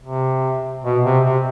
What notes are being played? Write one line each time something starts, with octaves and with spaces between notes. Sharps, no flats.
C3
B2
C3
C3